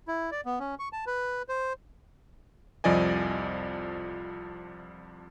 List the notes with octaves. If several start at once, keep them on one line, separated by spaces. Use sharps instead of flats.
E4
D5
B3
C#4
C#6
A5
B4
C5
C2 F2 F3 D5 D#5 G#5